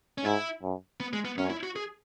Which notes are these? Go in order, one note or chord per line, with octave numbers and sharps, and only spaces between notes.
C#4
G#2 E4
F#2
B3
G#3
B3
F#2 C#4
E4
F#4
G#4